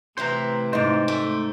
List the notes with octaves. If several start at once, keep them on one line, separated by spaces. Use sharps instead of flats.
A2 C3 E3 E4 G4 C5 A#5
G#2 D#4 C5 D5
A3